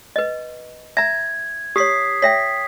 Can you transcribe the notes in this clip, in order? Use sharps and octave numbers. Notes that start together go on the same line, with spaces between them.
B4 D#5
E5 A#5 G#6
G4 C#5 D#6 B6 C7
C#5 E5 G5 B6